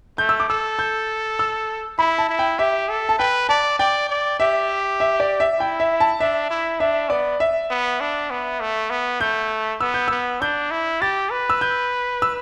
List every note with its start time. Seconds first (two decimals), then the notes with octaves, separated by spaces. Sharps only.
0.18 A3 G6
0.29 E6
0.40 D6
0.49 A4 E6
0.79 G6
1.39 E6
1.99 E4 B5
2.18 A5
2.29 E4
2.39 G5
2.59 G4 E5
2.89 A4
3.09 A5
3.19 B4 G5
3.49 D5 A5
3.79 D5 G5
4.09 D5
4.40 G4 E5
5.00 E5
5.20 D5
5.40 E5
5.60 E4 G5
5.80 E5
6.00 A5
6.20 D4 E5
6.50 E4
6.80 D4 E5
7.10 B3 D5
7.40 E5
7.71 B3
8.01 D4
8.31 B3
8.60 A3
8.90 B3
9.21 A3 G6
9.81 B3 E6
9.94 G6
10.08 B3 E6
10.41 D4 G6
10.71 E4
11.01 G4 A6
11.31 B4
11.50 E6
11.61 G6
12.22 E6